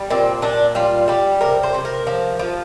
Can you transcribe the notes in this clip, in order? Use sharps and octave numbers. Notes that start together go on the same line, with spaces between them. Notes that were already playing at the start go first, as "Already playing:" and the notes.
Already playing: G3
A#2 C4
A#2 D4
G3 F4
G3 G4
C3 A#4
C5
C3
A#4
F3
F3